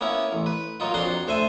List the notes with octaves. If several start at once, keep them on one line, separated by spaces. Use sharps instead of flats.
A#3 B3 C#4 E4
A1
B4
F#3 A#3 D#4 F4
F2 D4 F#4 F#5 C6
D2 C5 E5 G#5 A5